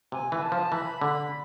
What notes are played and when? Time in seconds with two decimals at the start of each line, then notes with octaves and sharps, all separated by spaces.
0.12 C3 G#5
0.32 E3
0.42 A5
0.52 F3
0.72 E3 B5
1.01 D3 B5